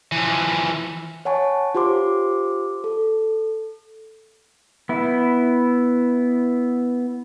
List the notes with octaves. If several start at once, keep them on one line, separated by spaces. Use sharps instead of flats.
E3 F3
C#5 F#5 G#5 A5 C#6
F4 G4 C5 C6 D6
A4
B3 E4